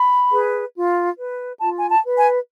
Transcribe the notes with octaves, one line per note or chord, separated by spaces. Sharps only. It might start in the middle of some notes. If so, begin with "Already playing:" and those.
Already playing: B5
G#4 B4
F4
B4
F4 A5
G#5
A5
B4
G#5